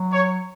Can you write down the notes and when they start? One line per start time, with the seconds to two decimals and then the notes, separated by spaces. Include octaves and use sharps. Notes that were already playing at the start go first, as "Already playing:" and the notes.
Already playing: F#3
0.13 C#5